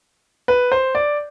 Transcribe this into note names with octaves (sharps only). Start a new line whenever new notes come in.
B4
C5
D5